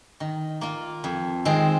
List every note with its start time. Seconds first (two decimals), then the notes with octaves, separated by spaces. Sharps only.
0.20 D#3
0.61 A#3 F4
1.04 F2
1.45 D#3 G#3 C4